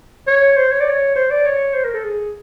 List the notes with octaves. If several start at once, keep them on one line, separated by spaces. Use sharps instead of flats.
C#5
C5
C#5
D5
C#5
C5
D5
C#5
C5
A#4
A4
G#4